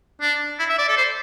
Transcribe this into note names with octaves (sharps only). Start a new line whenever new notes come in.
D4
E4
E5
D5
A4
C5